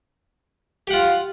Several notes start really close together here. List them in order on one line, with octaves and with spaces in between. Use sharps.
G4 F#5 F4